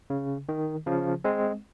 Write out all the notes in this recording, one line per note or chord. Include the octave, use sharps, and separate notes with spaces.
C#3
D#3
C#3 F3
G#3 C4